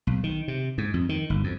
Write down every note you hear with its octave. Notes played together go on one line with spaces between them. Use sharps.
B1
D#3
C3
G#2
F2
D#3
G1
F2